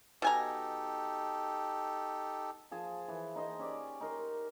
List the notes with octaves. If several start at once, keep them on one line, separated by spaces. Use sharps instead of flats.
B2 D#4 G4 A4 G#5 A#5
F3 G#4 A5
E3
D#4 C5 D#5
C#4 G4 D5
D#4 A#4 C6